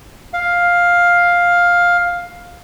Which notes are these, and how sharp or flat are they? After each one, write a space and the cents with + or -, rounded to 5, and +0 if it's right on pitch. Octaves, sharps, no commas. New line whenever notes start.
F5 +10